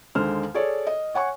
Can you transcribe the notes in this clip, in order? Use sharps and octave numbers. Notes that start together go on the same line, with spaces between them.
D#2 D3 G#3 C5 F6
G#4 A4 C#5 D5
D#5
C#5 F#5 G#5 C#6